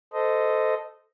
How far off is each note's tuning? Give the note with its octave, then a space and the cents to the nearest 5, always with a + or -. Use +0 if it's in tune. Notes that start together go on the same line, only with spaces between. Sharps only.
A4 +0 C5 -20 D#5 +0